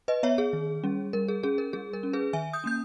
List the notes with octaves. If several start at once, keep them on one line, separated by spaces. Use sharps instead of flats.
B4 D#5
B3 C#5 E5
G#4
D#3
G3 C#4
G3 A#4
G#4
C#4 G#4
A#4
G3 G#4
A#4
C#4
G#4 B4
D#3 E5 G#5
D#6 G6
A#3 C#4 G6